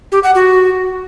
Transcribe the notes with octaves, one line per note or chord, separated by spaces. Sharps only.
G4
F#5
F#4